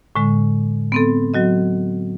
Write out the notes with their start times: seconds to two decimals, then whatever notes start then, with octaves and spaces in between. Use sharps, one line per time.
0.16 A2 D3 G#3
0.92 B3 C4 A4
1.34 F#3 F#4 D#5